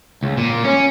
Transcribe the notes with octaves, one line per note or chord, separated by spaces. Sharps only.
C#2
A#2
C#4